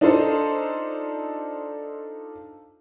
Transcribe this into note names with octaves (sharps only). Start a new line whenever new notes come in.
D4 D#4 F4 A4 C5